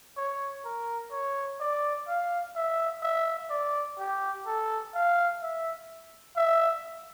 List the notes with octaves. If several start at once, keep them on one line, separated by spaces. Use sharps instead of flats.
C#5
A#4
C#5
D5
F5
E5
E5
D5
G4
A4
F5
E5
E5